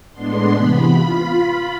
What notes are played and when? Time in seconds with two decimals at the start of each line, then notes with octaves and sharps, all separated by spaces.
0.13 A2 G#3 B3 D4 C6
0.50 C3 E3 B3 B5
0.89 F4